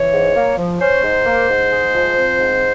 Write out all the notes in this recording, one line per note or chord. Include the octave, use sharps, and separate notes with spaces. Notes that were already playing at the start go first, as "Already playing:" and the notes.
Already playing: E3 C#5
G#2
A#3
F3
C#4 C5
G#2
A#3
G#2
G#3
F3
C4
G#2